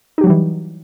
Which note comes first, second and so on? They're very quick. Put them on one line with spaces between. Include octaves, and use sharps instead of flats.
D#4 G4 F#3 G3 E3